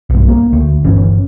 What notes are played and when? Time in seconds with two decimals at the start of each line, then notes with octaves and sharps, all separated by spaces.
0.10 B1 G2
0.28 A#3
0.53 D2
0.84 G1 E3 C#4